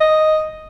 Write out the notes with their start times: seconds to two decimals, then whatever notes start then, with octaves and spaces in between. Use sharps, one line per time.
0.01 D#5